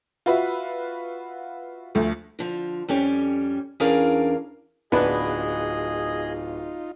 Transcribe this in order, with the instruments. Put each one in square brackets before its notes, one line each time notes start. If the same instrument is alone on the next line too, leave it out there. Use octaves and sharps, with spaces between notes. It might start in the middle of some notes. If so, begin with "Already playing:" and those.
[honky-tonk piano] F4 F#4 B4 E5
D2 F3 A3
[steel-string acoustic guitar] D3 F3
F2 G3 C#4 G4 C#5
E2 C#4 D4 G#4 A#4 F5
[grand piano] D1 [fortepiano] B3 D4 B4 [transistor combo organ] D#4 F4 [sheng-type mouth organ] G#4 D#5